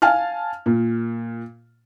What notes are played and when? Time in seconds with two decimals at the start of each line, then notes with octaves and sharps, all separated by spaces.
0.02 F5 G#5 A5 F6
0.66 A#2